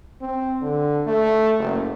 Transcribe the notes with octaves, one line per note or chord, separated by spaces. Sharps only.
C4
D3
A3
F#1